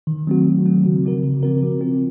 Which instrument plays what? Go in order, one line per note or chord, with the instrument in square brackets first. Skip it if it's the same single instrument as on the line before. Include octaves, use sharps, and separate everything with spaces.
[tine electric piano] D#3
F#3 A3 C4 F#4
D#3
F#3 A3 C4 F#4
C#3
F3 C4 F#4 A#4
C#3
F3 C4 F#4 A#4
F3
C4 F4